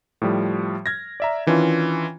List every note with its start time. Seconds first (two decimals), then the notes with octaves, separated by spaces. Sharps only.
0.22 A2 F3 G3
0.86 F6 G#6 A#6
1.20 D5 E5 A#5
1.47 D#3 E3 C#4 D4 F4